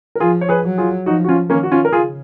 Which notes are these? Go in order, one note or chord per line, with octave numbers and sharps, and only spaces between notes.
A#4
F3 F4 G#4
C#5
G#4 B4
F#3
F4 G#4
F3 D#4 F#4
F#4
C#4 F4
D#3 A#3 C#4
F#4
C#4 F4
A#4
C#3 F4 G#4